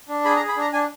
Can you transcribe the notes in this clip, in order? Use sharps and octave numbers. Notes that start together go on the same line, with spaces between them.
D4
G#4 B5
A#5
G#4
B5
D4 A#5
D4 G#5